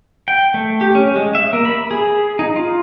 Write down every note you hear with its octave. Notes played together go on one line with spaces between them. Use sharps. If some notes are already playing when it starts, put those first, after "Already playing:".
G5
A3
G4
C#4
G#3
E5
A#3
B5
G#4
D#4
F4